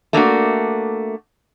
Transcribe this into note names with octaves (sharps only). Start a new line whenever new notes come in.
A3 A#3 D4 F#4